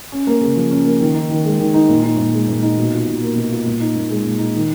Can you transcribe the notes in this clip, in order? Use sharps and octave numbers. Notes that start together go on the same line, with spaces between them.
C#4
A#3
C#3
F3
C#4
A#3
D#3
D#4
D#3
G#3
D#3
D#4
A#2
D#4
A#2
G#3
A#2
D#4
B2
F4
B2
A#3
B2
F4
A#2
D#4
A#2
G#3
A#2
D#4
D#3